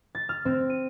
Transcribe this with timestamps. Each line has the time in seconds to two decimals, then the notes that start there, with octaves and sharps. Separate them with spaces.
0.15 A6
0.29 F6
0.45 C4
0.70 D#7